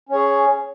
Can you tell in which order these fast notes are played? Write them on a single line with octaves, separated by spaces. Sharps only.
C#4 C#5 G#4